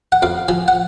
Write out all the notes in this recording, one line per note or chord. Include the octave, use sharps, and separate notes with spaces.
F#5
F2 F5
F3 G#5
F#5